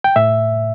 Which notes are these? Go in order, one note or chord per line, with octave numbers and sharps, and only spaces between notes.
G5
A2 E5